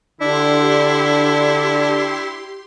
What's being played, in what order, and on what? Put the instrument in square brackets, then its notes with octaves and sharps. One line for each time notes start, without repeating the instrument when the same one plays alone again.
[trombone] D3 [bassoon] D4 [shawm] E4 [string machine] G4 C6